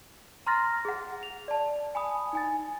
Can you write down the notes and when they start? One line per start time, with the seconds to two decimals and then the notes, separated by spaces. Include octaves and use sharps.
0.46 A#5 C6 F6 A6 A#6
0.85 G#4 F#5
1.23 F7
1.48 D5 A5
1.95 G#5 B5 D#6
2.33 D#4 G#5 A6